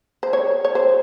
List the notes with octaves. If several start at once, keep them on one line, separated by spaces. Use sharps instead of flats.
C5
C#5
C#5
C5